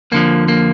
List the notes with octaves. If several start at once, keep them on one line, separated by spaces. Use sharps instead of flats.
F2 D3 F3 A#3
A#3